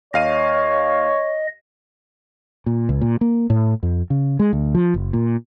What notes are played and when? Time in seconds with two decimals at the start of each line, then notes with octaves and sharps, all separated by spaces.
0.14 D#2 C#5 D#5 F5 D#7
2.66 A#2
2.89 C#2
3.01 A#2
3.21 A#3
3.50 A2
3.83 F2
4.10 C#3
4.39 G#3
4.53 D2
4.75 F3
4.94 F#1
5.13 A#2